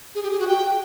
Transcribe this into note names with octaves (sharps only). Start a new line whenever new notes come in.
G#4
G4
G#4
F#4
G5